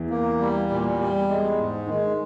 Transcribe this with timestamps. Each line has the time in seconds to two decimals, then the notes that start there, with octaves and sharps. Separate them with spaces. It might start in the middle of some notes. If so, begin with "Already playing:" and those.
Already playing: E2 E3
0.10 A#3
0.40 G3
0.70 A#2
0.99 G3
1.28 G#3
1.58 G#2
1.87 D#3 G#3